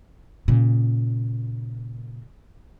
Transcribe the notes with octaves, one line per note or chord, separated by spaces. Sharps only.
A#2 C#3